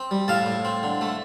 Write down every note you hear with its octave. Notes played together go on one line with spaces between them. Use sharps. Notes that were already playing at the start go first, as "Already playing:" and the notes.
Already playing: C4
G3
A2 F5 A5
A2
C4
D3
A3